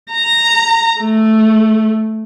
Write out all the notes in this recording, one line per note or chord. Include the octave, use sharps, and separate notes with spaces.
A#5
A3